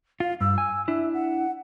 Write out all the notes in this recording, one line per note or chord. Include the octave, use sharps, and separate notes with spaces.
F4 F5
G2 E6
G#5
D4 E4 E5
F#5